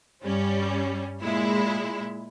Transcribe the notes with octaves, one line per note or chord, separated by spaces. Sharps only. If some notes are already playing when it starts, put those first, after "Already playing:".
G2 G3 C#4
A#2 G#3 E4